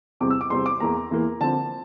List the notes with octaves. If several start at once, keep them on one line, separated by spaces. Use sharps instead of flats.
E2 C3 G3 C4 D6
E6
D6
E2 C3 G3 C4 C6
D6
E2 E3 A#3 A#5
E2 E3 A#3
D3 F3 C4 A5